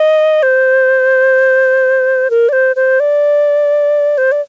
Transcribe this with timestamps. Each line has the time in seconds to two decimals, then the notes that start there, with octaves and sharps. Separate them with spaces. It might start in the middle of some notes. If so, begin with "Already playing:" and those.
Already playing: D#5
0.43 C5
2.30 A#4
2.49 D5
2.53 C5
2.76 C5
3.00 D5
4.18 C5
4.32 D5